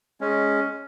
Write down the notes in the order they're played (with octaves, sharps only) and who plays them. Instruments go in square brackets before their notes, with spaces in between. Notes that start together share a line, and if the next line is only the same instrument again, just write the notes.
[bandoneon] G#3 C#4